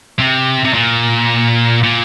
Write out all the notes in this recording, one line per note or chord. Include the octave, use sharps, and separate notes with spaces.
C3
C3
A#2
A#2